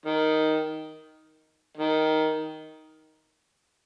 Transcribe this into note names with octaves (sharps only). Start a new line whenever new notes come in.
D#3
D#3